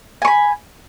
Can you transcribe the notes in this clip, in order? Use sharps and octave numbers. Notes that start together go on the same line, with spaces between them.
G#5 B5 C#6